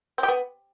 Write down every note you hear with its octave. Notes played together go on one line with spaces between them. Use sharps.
C4
G4
B3